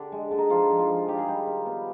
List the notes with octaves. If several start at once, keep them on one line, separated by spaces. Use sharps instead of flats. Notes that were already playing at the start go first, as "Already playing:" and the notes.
Already playing: D3 G4
G#3
D3
D#4
F3 F4
F3
F4
F3
D#3 G4
G#4
G3 G4
D#3
B3